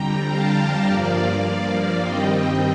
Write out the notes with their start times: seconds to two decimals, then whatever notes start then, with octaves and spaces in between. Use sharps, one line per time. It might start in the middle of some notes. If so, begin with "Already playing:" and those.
Already playing: F2 D3 G3 G5 A#5
0.27 F5 A5
0.85 G2 F3 A#3 D5 F5
2.00 G2 D#3 G3 C4 D#5 G5